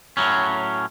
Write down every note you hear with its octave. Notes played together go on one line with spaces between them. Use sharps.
A2 F#3 C#4